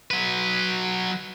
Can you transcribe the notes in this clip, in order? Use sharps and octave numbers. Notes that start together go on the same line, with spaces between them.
F#3 B4